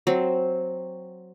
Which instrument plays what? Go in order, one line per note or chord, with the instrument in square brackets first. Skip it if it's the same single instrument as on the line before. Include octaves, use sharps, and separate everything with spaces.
[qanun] F#3 C4